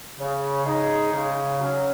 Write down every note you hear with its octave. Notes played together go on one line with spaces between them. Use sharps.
C#3
G#3 D#4 G#4
C#3
F#3 C#4